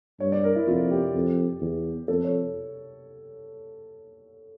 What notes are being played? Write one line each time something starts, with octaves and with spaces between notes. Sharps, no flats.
G2 C#5
D5
A#4
E4
F2 F4
G4
F2
E2
F2 A4
C#5